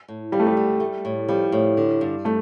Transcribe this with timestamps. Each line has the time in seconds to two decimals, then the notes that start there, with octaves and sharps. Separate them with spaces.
0.08 A2
0.32 F3 G3
0.40 A3
0.47 G3
0.57 D3
0.80 A3
1.05 A2
1.28 F3 G3
1.52 A2
1.77 D3
2.01 G2
2.25 G3 A3